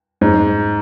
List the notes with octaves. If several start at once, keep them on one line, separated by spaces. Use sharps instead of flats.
G#2